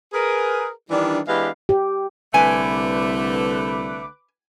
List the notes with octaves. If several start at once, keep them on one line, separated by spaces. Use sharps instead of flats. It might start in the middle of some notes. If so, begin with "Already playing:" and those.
G#4 A#4 B4
D#3 E3 G3 D4
E3 G#3 B3 D4 G4 F5
G4
C2 D3 A3 B4 G#5 D6